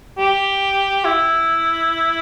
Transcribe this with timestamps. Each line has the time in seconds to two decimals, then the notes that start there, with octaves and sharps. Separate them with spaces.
0.19 G4
1.05 E4